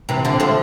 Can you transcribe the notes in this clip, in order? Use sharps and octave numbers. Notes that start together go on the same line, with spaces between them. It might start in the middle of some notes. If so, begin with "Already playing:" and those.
C3 E3
D3 F3
F3 A3